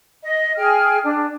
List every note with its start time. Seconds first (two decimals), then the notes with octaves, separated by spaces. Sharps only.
0.23 D#5
0.57 G#4 G5 F6
1.03 D4